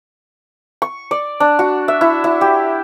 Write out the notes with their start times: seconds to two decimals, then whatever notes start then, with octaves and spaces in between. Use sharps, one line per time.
0.82 C#6
1.11 D5
1.40 D4
1.59 F#4
1.88 E5
2.01 E4
2.24 E4
2.41 G4